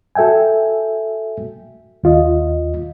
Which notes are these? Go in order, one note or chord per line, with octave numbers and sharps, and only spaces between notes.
F#4 A4 E5 G5 G#5
D#2 F4 D#5